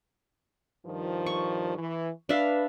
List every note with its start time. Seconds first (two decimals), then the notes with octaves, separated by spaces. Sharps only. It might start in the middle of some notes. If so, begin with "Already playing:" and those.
0.86 G2 D#3 F3
1.26 C#6
1.78 E3
2.29 D4 B4 E5 F5